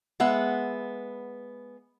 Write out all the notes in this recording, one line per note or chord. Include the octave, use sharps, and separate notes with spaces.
G#3 B3 E5 F#5